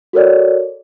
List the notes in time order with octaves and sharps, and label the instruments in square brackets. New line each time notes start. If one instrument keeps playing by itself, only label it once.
[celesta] F#4 A4 A#4 C#5 D5